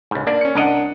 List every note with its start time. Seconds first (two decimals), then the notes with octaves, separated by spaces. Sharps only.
0.11 C#2 G#2
0.27 A#3 D4 D5
0.41 C#4 C#7
0.55 C2 D4 A#4 D#5 F#5